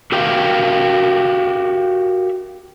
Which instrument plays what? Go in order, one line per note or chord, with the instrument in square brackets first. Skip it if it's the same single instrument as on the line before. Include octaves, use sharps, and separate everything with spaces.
[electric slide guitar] F#4 G4 A#4 E5 F5 G5